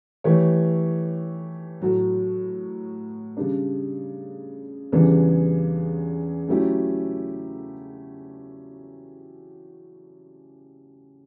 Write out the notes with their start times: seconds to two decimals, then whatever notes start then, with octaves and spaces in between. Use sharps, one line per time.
0.24 E3 A3 E4 G4 C#5
1.81 A2 F#3 A3
3.37 C#3 G3 D4
4.92 E2 C#3 E3 G3 D4
6.48 F#3 A3 C#4 E4 G4